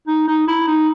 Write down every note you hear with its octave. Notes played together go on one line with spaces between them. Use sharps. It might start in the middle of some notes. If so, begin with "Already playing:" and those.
D#4
D#4
E4
D#4